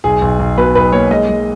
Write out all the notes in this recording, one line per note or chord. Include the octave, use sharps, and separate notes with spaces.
B1 G#4
B1
B1
B2 B4
B1 B4
A#3 C#5
G#3 D#5
G#3